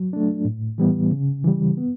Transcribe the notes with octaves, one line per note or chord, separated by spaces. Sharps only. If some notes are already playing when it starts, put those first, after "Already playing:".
Already playing: F#3
A3 D4
A2
E3 G3 B3
C#3
E3 G3
B3